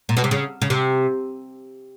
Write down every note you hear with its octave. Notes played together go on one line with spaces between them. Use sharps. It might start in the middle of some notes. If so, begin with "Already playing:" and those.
A#2
B2
C3
C#3
C#3
C3